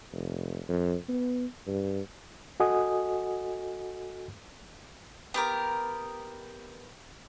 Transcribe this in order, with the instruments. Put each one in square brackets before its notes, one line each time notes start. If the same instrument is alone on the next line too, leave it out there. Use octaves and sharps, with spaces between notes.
[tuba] F1
F2
B3
G2
[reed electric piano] F#4 A4 D#5 F#5 G#5 D#6
[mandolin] B3 G4 A#4